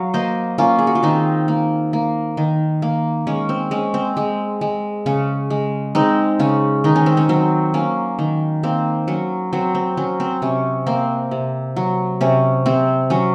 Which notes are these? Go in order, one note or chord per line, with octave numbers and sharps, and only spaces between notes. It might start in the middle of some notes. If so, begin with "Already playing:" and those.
Already playing: F#3 F5
A#3 C5 D#5
A#3 C#4 F4
G#4
F#4
F4
D#3 C4 D#4
A#3
A#3
D#3
A#3
G#3 C#4
C4
G#3 C#4
C4
G#3
G#3
C#3 C#4
G#3
G#3 C4 D#4
C#3 C#4
D#3 D#4
C#4
C4
C#4
F#3 C4
A#3 C#4
D#3
A#3 C4
F#3 C#4
F#3 C4
C4
F#3 C#4
C4
C3 C#4
A#3 C4
C3
F#3
C3 C#4
C3 C4
F#3 C#4